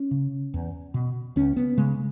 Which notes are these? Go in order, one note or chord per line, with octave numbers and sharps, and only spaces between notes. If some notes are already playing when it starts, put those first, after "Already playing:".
Already playing: C#4
C#3
E2
B2
C#2 C#4
B3
C#3 G#3